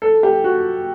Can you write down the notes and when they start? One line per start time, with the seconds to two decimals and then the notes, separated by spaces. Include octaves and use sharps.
0.02 A4
0.23 G4
0.44 F#4